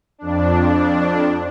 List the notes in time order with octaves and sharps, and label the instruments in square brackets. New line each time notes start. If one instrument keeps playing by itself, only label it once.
[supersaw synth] F2 D4